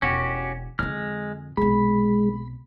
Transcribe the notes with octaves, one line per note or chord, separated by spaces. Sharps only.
E1 C#4 F#4 G4
F2 D3 G#3 F6
B1 C3 G#3 B5